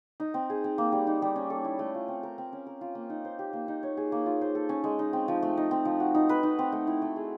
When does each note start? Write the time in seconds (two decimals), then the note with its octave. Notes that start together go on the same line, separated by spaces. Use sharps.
0.20 D#4
0.34 C4
0.50 G#4
0.64 C4
0.78 A#3
0.92 G3
1.07 D#4
1.22 G3
1.36 C#4
1.50 A4
1.65 E4
1.79 A3
1.94 F4
2.08 C4
2.23 A#4
2.38 C4
2.53 C#4
2.66 A#4
2.81 F4
2.95 A#3
3.10 D#4
3.25 C5
3.39 G4
3.53 A#3
3.68 D#4
3.83 C#5
3.97 G#4
4.12 A#3
4.26 F4
4.41 C5
4.55 A4
4.69 C#4
4.84 G#3
4.99 D#4
5.13 C4
5.28 F3
5.43 A3
5.57 D#4
5.71 C4
5.85 F3
6.00 F#4
6.15 D#4
6.29 B4
6.43 D#4
6.59 C4
6.72 A3
6.87 E4
7.02 A3
7.16 G#4